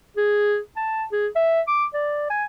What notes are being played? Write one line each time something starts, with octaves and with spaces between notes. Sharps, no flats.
G#4
A5
G#4
E5
D6
D5
G#5